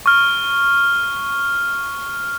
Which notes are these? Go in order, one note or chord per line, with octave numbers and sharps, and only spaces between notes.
C#6 F6